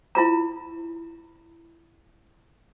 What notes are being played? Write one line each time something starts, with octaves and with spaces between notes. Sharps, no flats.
E4 F4 A#5